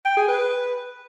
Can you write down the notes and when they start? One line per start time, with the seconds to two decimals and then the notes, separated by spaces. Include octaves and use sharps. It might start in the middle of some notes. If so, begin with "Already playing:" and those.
0.05 G5
0.17 G#4
0.28 B4